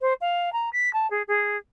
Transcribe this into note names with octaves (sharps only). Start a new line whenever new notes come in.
C5
F5
A#5
B6
A5
G#4
G#4